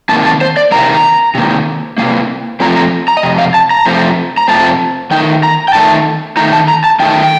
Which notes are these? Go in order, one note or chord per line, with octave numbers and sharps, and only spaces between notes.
C3 D#3 A#3 A5
A5
C5
D5
C3 D#3 A#3 A#5
C3 D#3 A#3
C3 D#3 A#3
F2 C3 F3 A3 C4 A#5
A#5
A#5
D#5
F2 C3
F5
A5
A#5
F2 C3 F3 A3 C4
A#5
F2 C3 F3 A3 C4 A5
D#3 A3 D#4 G5
A#5
G5
D#3 A3 D#4 A5
D#3 A3 D#4 A#5
A5
A#5
A5
D#3 A3 D#4 G5